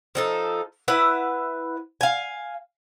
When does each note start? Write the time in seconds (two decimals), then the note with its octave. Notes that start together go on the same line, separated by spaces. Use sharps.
0.15 F3 D#4 A4
0.88 E4 B4 E5 F#5
2.01 F5 G#5